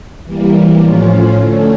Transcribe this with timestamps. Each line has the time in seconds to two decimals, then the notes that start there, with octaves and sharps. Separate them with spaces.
0.24 E3 G3 A#3
0.80 A2 F3 C#4 F4
1.36 D3 A3 C#4